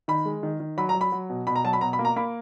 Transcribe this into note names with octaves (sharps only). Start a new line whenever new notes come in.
D#3 B5
G#3
D#3
D#3
F#3 B5
A#5
F#3
B5
F#3
B2
B2 B5
A#5
F#3 A5
B5
B2 A#5
B5
A#3
A#5
A#3 B5